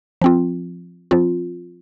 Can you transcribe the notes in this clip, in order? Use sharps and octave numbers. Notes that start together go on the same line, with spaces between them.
F3 C4 F4
F3 C4 F4